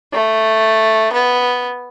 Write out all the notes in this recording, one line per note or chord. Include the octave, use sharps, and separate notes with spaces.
A3
B3